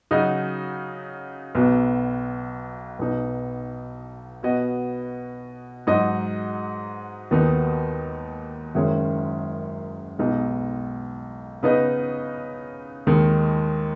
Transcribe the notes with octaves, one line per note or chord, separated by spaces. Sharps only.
C#3 F#3 D#4 F#4 D#5
B1 B2 B3 F#4
B1 B2 B3 D#4
B2 B3 F#4 D#5
G#2 F#3 D#4 F#4 D#5
D#2 D#3 B3 D#4 F#4
F#1 F#2 D#3 G#3 C#4
B1 B2 G#3 D#4
C#3 B3 D#4 B4 D#5
D#2 D#3 G#3